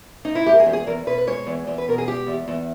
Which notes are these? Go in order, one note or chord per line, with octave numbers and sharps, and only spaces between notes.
D#4
E4
G#3 G4
A#4
G#4
E2 G4
G#4
E2 A#4
B2 B4
B4
G#3 C#5
E2
E2
B4
B2 A#4
G#4
G#3 G4
E2
E2